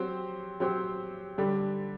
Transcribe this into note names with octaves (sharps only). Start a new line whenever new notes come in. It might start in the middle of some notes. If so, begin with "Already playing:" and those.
Already playing: F#3 C4 G4 C5
F#3 C4 G4 C5
D3 G3 D4 G4